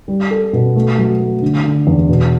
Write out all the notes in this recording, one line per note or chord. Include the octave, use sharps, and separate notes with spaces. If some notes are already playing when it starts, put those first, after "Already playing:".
G3
A4
B2
A3
F#3
A3
D3
D3
E2
B2